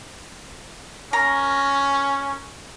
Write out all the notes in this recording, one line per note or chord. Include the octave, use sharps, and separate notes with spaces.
C#4 A#4